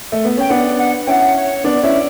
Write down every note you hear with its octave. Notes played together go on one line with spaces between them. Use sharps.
A3
B3
C#4 G5
B3 D4 F#5
F#5
C#4 E4 F#5 G5
C#5
B3 D4 D5
C#4 E4